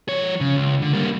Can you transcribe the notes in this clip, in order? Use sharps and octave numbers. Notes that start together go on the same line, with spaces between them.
F3 C#5
C#3
C#2
D3
G3 A#3